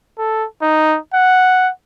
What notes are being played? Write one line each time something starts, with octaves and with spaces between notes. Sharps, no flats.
A4
D#4
F#5